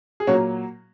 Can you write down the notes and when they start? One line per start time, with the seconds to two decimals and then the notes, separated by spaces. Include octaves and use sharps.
0.20 G#4
0.27 A#2 F#3 A#3 C#4 F#4